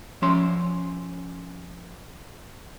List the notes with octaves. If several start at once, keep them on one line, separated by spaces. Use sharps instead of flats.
F3 C#4 C#5 E5 C6